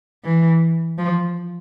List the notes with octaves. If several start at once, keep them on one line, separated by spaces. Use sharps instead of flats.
E3
F3